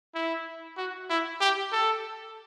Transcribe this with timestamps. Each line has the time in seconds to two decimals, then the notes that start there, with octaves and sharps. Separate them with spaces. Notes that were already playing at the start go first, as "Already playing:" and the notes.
0.15 E4
0.77 F#4
1.10 E4
1.40 G4
1.72 A4